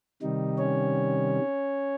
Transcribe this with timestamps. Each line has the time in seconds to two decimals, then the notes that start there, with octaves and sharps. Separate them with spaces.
0.22 C3 D#3 G3 D#4
0.58 C#4 C#5